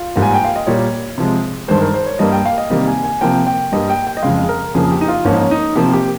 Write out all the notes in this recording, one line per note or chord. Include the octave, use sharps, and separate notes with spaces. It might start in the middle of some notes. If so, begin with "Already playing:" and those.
Already playing: F4
G#2 G3 A#3
G#5
G5
F5
D#5
A#2 G3 A#3 C#5
C3 F3 G#3
G2 D#3 G#3 C5
A#4
C5
C#5
G2 G3 A#3 D#5
G5
F5
D#5
C3 D#3 G3 A#3 D#5
G#5
G#5
C3 F3 A#3 G5
G5
G2 G3 A#3 D#5
G5
G5
D#5
F2 C#3 G#3 F5
G#4
A#4
F2 C#3 F3 A#3 G#4
G4
D#4
F4
G#2 F3 A#3 C#4
D#4
C#4
D#4
C3 F3 A#3 G4
G4